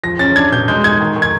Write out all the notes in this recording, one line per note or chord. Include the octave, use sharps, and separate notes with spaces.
F3 A#6
C#4 A6
D4 G#6
B2 G6
G#3 G6
D#4 G#6
D#3
D#3
G#6